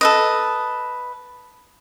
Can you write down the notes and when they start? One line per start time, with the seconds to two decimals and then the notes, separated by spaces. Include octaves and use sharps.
0.01 A4 B4 D#5